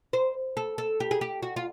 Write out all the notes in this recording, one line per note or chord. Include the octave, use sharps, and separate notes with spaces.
C5
A4
A4
G4
G#4
G4
F#4
F4